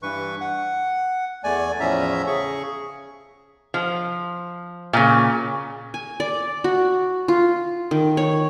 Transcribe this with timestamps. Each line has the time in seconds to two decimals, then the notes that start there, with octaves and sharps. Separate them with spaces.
0.03 G2 E3 B4 C#6
0.41 F#5
1.44 E2 A3 D5 G#5
1.80 E2 A2 F3 C#4 E5 A#5
2.27 C#3 G#4 C#6
3.74 F3
4.93 A#2 C#3
5.94 G#5
6.20 D5
6.64 F#4
7.28 F4
7.91 D#3
8.17 C#5